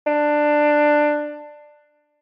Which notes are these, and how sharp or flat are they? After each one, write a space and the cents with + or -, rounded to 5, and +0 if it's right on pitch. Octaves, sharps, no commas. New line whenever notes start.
D4 +15